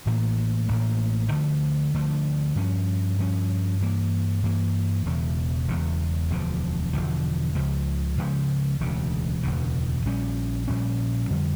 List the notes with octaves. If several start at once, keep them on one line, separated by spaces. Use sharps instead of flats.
A1 A2 E3 A#3
A1 A2 E3 A#3
D2 D3 F3 A3
D2 D3 F3 A3
G2 F3 C#4
G2 F3 C#4
G2 E3 A#3
G2 E3 A#3
E1 E2 C#3
E1 E2 C#3
E1 D2 D3 F3
E1 D2 D3 F3
C#2 C#3 F3
C#2 C#3 F3
E1 D2 C#3
E1 D2 C#3
A#1 A#2 G3 C#4
A#1 A#2 G3 C#4
F2 D3 G3